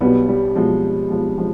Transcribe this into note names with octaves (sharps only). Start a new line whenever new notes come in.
B1 B2 G3 B3
G3
B1 B2 F3 G#3
B1 B2 F3 G#3
F3 G#3